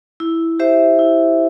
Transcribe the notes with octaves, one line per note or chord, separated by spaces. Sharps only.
E4
G4 C5 E5
E4